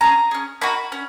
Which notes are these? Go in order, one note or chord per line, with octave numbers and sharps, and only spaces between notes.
C#4 G#4 A#5
C#4 G#4
A#3 D#4 F#4 B5
C#4